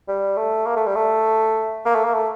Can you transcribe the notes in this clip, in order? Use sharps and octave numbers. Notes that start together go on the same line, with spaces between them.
G3
A3
A#3
A3
G3
A3
A#3
A3
A#3
A3